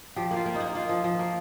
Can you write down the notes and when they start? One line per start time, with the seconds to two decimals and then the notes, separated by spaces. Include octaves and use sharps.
0.16 F3 G4
0.31 A#3
0.36 F4
0.46 A#3
0.55 D#4
0.60 A#3
0.70 D#4
0.75 A#3 F4
0.89 F3
1.04 F3
1.19 A#3